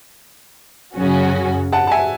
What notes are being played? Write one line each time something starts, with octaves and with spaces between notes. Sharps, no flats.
F#2 C#3 F#3 C#4 F#4
F#5 A5
A5
E5 G#5